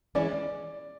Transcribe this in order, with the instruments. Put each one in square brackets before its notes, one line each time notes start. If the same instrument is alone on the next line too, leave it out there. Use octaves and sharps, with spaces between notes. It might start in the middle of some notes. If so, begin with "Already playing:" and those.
[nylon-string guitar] E3 G#3 C#4 E4 [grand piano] D5